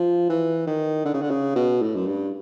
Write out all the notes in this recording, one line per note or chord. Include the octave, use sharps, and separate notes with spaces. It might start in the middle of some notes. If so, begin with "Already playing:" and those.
Already playing: F3
E3
D#3
D3
C#3
D3
C#3
B2
A2
F#2
G2